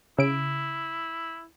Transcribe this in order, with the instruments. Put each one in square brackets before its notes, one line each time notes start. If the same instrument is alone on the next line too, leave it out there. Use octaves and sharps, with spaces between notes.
[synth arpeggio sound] C#3 D7 [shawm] E4